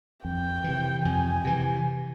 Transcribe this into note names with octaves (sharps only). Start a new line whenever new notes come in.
F2 G5
C3 E3
F2 G#5
C3 E3